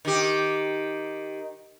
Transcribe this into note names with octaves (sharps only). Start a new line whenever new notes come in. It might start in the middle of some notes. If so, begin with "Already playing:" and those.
D#3 G4